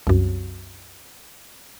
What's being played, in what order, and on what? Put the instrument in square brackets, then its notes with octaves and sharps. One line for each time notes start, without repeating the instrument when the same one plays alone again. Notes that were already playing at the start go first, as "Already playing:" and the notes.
[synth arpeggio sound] C2 F#2